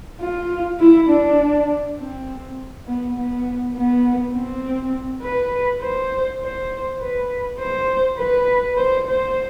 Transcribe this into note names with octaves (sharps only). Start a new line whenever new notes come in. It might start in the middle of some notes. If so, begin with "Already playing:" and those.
F4
E4
D4
C4
B3
B3
B3
C4
B4
C5
C5
B4
C5
B4
C5
C5